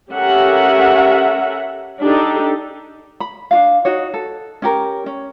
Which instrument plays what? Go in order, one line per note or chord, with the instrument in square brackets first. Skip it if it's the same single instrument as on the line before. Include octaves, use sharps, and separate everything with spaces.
[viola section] C#4 G4 A4 A#4 E5 F#5
D4 D#4 G4 A4
[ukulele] B5
D4 F#4 F5
D#4 F#4 C#5
A4
C#4 G4 A#4
C#4